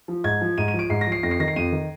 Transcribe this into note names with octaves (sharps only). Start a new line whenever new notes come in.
F3
G#2 G#6
F3
G#2 D#7
D#7
F3
D7
G#2 C7
A#6
F3
C7
F2 A#6
C7
D#3 A#6
C7
F2 D#7
D#3